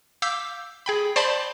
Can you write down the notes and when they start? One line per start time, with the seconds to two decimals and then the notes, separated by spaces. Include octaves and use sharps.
0.22 F5 D6 E6 G6 B6
0.86 G#4 G5 B5
1.16 C5 D5 A5 B5 C6 G6